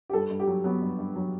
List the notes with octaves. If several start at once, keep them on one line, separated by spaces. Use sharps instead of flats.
G4
G2 A4
G2
G4
F#3
F#3 B3
G2
G2
F#3